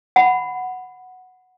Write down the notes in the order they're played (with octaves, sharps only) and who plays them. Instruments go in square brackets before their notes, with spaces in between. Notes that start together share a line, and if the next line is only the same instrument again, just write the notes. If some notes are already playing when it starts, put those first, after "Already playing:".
[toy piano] F#5 B5